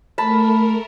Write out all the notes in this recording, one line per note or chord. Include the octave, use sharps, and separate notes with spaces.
A3 A#4 A5 B5